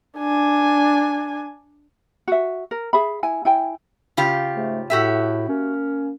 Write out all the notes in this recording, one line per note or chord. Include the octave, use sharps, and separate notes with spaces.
D4 G#5
F#4 E5
A#4
G#4 E5 B5
E4 G#5
E4 G5 G#5
C#3 F4 G4
G#2 A3
A2 F#4 G4 E5
A#3 C#4